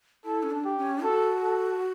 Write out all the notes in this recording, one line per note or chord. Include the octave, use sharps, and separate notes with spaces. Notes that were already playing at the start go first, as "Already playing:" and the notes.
E4 A4
C#4
D4
G4
C#4
F#4 A4
A4